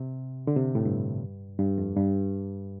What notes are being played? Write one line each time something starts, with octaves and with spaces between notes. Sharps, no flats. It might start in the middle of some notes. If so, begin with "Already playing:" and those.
Already playing: C3
D3
C3
A2
G2
G2
F2
G2